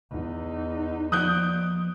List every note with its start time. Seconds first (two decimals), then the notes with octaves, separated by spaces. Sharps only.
0.10 E2 D#4
1.12 F3 D5 D#6 F#6 G6